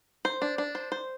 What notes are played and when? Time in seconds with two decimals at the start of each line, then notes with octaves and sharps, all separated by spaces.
0.25 C5
0.42 D4
0.58 D4
0.75 C5
0.92 C5